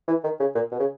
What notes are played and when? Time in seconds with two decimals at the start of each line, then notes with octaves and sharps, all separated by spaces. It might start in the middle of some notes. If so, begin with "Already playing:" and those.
0.08 E3
0.24 D#3
0.40 C#3
0.55 A#2
0.72 B2
0.80 C#3